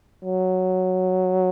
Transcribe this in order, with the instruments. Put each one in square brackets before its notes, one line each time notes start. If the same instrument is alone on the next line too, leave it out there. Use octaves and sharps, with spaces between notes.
[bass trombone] F#3